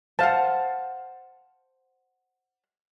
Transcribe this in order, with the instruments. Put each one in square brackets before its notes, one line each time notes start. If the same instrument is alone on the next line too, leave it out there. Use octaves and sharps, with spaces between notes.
[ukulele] C5 F#5 [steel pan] F5 A5